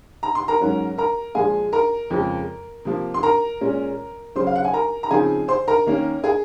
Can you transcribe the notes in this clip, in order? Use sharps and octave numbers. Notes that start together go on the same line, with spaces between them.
A#5
C6
A#4 A#5
G#2 F#3 C#4
A#4 A#5
A#2 F3 G#3 G#4 G#5
A#4 A#5
F2 C#3 F3 G#3
C3 F3 A#3
C6
A#4 A#5
A#2 G#3 C#4
C#3 F#3 C#4 C5 C6
F5
F#5
G#5
A#4 A#5
A#5
C#3 F3 C4 D#4 G#4 G#5
C5 C6
A#4 A#5
D#3 A#3 C#4
G#4 G#5